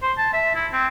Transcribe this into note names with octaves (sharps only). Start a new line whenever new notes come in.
C5
A5
E5
E4
C4